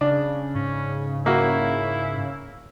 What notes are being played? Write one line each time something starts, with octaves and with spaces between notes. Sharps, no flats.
C#3 D4
G#2 C#4
A#3 E4 F#4